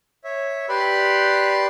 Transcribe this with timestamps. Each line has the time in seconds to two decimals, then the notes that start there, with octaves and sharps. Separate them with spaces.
0.24 C#5 E5
0.69 G4 B4 D5 B5 C6